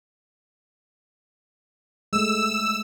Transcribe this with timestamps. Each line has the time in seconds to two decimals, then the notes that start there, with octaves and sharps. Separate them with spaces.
2.13 G#3 A3 E6